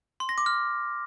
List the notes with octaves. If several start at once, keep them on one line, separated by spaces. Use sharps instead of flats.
C6
A#6
D6
F6